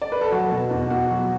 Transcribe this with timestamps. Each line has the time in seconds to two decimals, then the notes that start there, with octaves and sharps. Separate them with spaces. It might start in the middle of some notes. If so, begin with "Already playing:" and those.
0.02 D5
0.12 B4
0.21 A4
0.31 F#3 F#4
0.52 B2
0.70 E2
0.90 E2 F#4
1.11 F#3